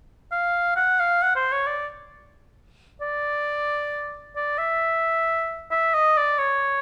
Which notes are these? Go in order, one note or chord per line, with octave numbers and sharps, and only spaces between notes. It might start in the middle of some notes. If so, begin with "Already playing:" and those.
F5
F#5
F5
F#5
C5
C#5
D5
D5
D5
E5
E5
D#5
D5
C#5